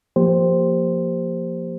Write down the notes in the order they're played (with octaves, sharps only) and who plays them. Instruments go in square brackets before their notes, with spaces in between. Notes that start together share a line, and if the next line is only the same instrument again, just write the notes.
[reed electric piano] F3 A#3 G4 C5